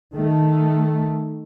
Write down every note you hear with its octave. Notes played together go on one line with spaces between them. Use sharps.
D#3 A3